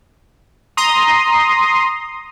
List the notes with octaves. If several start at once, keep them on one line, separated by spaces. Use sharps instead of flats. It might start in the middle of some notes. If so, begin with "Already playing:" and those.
A#5 C6 D#6